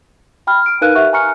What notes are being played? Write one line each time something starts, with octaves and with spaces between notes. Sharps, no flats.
G5 B5 F6
F6 D7
D#4 A#4 B4 F5 F#6 D#7
G4 E5 F#5 C#6 F#6
G#5 A#5 C#6 F6 C#7